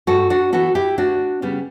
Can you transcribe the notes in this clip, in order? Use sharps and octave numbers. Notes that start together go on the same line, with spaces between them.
G2 F#4 A4
D4 F#4
E3 B3 F#4 A4
E4 G4
D2 D4 F#4
C#3 G3 B3